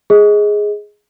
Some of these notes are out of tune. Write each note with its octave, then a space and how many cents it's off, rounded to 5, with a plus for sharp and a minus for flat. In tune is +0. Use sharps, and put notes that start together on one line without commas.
G#4 +0 D#5 +20